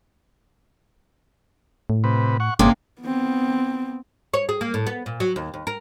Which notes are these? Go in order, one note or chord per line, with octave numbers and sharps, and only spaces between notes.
A2
C3 B4
F#5 C#6
G1 C3 A#3 C#4 D4 G#4 C5
B3 C4
C#5
G#4
A#3
A2
B3
A#2
F#3
D#2
D#2
A#4